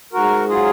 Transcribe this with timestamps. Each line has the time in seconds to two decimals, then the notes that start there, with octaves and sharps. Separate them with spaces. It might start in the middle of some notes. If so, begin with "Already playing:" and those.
0.13 G#2 F#4 A#4
0.49 F#3 F4 G#4